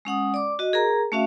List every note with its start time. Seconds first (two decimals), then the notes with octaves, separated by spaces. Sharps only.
0.05 G#3 C#4 F#5 D#6
0.34 D5 D6
0.59 F#4 D#5
0.73 G#4 A#4 A#5
1.12 A3 C#4 F#4 E5 F5